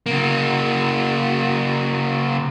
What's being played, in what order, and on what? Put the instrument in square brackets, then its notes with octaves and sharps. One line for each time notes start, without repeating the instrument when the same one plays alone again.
[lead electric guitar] C#3 A#3